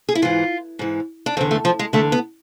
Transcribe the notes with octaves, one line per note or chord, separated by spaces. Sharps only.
G#4
E4
G#2 E3 F4
G#2 E3
D4
E2 D3 C4
A3
F3
G#3
E2 D3 A3
B3